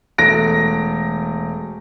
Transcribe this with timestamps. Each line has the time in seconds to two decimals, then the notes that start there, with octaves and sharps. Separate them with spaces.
0.18 E1 A3 A#6 D7